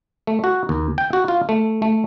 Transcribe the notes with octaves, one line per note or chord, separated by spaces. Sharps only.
A3
F#4
D#2
G5
F#4
F4
A3
A3